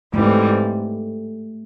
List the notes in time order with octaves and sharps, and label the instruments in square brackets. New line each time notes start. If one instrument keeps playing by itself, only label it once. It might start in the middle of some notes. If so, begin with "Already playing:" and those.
[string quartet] G#2 E3 G3 C4 [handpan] A3